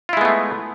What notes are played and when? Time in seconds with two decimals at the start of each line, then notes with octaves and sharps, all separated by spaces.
0.09 F4
0.13 E4
0.17 G#3
0.21 B3
0.25 A3